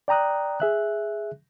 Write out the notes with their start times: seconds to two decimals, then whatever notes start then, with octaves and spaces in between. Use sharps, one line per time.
0.08 D5 G5 A#5 D#6 F#6
0.60 G#4 E5 F#6